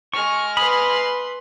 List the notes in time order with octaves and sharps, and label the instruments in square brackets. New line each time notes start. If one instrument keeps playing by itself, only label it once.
[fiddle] G#3 F6 [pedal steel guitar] C#6
[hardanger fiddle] B4 C6 [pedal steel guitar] B5 D#6